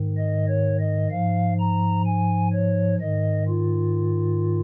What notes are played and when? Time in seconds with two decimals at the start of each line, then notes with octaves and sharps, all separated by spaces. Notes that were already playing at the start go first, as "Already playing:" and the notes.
Already playing: G#2 D#3
0.17 D#5
0.49 C#5
0.79 D#5
1.11 G#2 F3 F5
1.59 A#5
2.06 G#5
2.53 C#5
3.00 G#2 D#3 D#5
3.48 F4